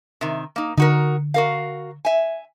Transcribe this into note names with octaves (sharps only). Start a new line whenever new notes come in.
C3 D#3
A#3 D#4
D3 D#4 F#4 A#4
F#4 A#4 F5
E5 G#5